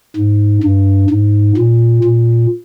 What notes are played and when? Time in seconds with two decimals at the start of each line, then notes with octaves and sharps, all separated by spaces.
0.16 G#2
0.63 G2
1.10 G#2
1.57 A#2
2.04 A#2